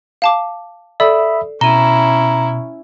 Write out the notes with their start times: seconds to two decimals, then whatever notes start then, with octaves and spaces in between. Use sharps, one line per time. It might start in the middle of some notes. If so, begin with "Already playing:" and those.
0.22 F5 A5 D6
1.00 A4 D5 E5 B5 D#6 E6
1.61 B2 C#4 E4 A#5 D#7 G7